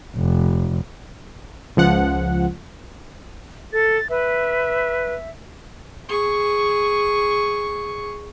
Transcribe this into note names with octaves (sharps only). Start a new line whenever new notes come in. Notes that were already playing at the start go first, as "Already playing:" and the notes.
F1
C#2 F3 F#5
A4 A6
B4 E5
G#4 C#6